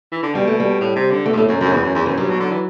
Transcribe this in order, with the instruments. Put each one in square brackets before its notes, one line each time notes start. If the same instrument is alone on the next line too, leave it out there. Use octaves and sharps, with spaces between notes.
[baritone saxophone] E3
D3
[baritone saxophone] B2 [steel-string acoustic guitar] G3
[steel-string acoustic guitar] A3
G3
[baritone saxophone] A2
C3
D3
[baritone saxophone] B2 [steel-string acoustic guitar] A3
[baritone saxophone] G2
[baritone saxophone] A2 [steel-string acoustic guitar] A3
[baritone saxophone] F#2 [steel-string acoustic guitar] F#3
[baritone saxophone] F#2 [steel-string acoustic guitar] F#3
[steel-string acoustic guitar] D3
[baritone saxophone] E2 [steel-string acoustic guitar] E3
[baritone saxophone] F#2
E2
[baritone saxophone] F#2 [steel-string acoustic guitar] E3
[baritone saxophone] G2 [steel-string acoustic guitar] F#3
[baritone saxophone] B2
D3
E3